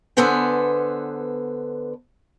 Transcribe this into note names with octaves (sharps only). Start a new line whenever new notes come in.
D3 B3 A4 B4 C5 G#5